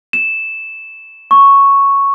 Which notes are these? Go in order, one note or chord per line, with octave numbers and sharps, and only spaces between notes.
E7
C#6